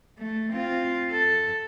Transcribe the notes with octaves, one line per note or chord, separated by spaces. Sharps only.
A3
C4 F4
A4